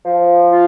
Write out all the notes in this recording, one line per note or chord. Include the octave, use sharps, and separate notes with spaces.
F3
F4